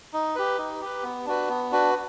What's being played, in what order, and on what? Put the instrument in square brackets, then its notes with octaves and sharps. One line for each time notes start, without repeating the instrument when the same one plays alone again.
[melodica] D#4
G4 B4
D#4
G4 B4
B3
D4 F#4 B4
B3
D4 F#4 B4